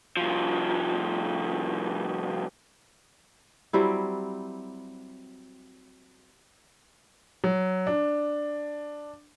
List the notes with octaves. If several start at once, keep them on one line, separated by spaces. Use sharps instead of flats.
C2 F3
F#3 G3 C4 E4
F#3
D4